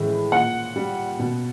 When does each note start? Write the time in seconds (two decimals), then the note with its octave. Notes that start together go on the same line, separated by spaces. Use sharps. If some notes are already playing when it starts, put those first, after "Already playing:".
Already playing: A2 E3 G#3
0.32 A#2 F#5
0.76 G3
1.19 B2